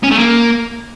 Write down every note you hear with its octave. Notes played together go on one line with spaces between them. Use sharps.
C#4
A3
A#3